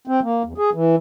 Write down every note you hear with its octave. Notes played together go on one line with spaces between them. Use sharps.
C4
A#3
E2
G#4
E3